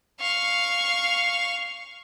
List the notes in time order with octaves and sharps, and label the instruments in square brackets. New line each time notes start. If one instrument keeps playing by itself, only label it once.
[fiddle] F5 C#6